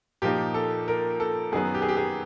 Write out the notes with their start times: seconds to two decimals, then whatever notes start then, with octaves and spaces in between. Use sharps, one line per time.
0.22 A#2 F3 A#3 D#4 G4
0.54 A4
0.88 A#4
1.20 A4
1.52 F#2 D#3 F#3 B3 G#4
1.74 G4
1.82 G#4
1.89 G4
1.97 G#4